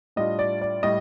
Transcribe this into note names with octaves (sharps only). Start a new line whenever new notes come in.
A2 G3 D4 F4 D#5
D5
D5
A2 G3 D#5